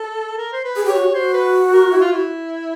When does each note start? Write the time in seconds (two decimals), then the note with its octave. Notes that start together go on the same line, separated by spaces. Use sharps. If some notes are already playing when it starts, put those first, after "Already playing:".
Already playing: A4
0.38 A#4
0.53 C5
0.64 B4
0.76 G#4
0.85 G4 C#5
0.95 F#4
1.04 G4
1.14 F#4 C5
1.34 B4
1.73 A#4
1.92 E4
2.01 F4
2.12 E4